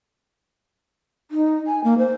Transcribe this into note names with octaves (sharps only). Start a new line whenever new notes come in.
D#4
G#5
A#3
C5